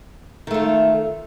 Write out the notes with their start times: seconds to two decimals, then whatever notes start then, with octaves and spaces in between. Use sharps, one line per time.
0.47 D#3
0.51 A3
0.54 F4